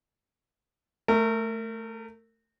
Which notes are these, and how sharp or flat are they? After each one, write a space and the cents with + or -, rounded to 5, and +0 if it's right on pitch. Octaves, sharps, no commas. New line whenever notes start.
A3 +0 A#4 -30